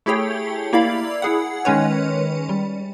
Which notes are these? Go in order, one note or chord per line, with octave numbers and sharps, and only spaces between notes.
A3 E4 G4 G#4 C#5 G5
A#3 E4 D5 F5 B5
E4 G#4 F#5
D#3 G#3 C#4 B4 C#5
G3